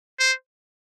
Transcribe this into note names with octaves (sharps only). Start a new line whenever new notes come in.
C5